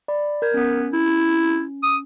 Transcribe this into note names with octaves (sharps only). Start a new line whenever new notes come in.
D5 B5
A#4 G6 G#6
B3 C#4
E4
D#6